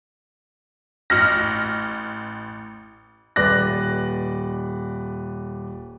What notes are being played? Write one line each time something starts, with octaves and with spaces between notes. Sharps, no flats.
A1 F6 A#6
D#1 B4 D5 F#6 A#6